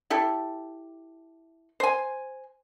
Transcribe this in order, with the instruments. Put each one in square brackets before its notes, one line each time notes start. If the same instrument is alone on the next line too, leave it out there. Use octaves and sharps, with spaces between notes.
[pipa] E4 G4 A4
C5 G#5